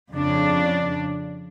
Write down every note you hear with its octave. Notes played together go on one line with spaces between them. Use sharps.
F2 C#3 D4